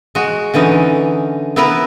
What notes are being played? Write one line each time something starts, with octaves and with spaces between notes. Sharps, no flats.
G#3 F#4
D3 E3 C#4 D#4
B3 E4 A#4 B4